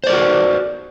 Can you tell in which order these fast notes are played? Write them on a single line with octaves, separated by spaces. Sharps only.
C5 D5 A#4 F#4